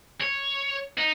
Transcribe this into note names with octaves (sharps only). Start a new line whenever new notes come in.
C#5
D#4